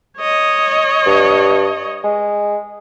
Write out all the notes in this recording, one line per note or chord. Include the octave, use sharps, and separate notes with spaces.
C#5 D#5
G2
G#3